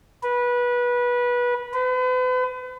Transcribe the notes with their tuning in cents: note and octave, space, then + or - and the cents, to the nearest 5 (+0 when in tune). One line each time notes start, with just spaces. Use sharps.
B4 -20
B4 +40